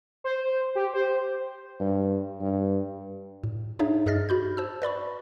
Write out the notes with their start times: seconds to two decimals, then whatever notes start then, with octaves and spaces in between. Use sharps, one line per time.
0.24 C5
0.75 G4
0.94 C5
1.80 G2
2.41 G2
3.44 A2
3.79 D4 D#4 G#4 C#5 E5
4.06 G2 G#4 D#5 F6 A6 A#6
4.29 F#4 B5 G6
4.57 C5 A5 E6
4.82 B4 D5 B5 C#6